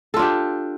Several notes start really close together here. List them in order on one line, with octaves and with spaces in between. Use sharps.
A4 F4 D4 G4